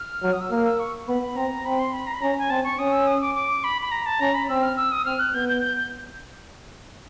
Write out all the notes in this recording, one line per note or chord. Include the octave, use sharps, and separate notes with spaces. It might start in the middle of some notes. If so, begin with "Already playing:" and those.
Already playing: F6
F#3
D#6
E6
A#3 F6
E6
C#6
B3 B5
C4 A#5
C4 B5
C6
B5
A#5
B5
C#4 A#5
G#5
C4 A5
C#6
C#4 D#6
E6
D#6
D6
D6
B5
B5
A#5
A5
C#4 A#5
B5
C4 E6
F6
E6
D#6
C4 F6
F#6
B3 G6
G6
G6
G6